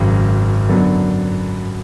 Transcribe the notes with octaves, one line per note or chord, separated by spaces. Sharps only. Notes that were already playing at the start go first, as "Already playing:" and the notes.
Already playing: G#1 F#2 C#3 F#3
F#2 D3 F#3 B3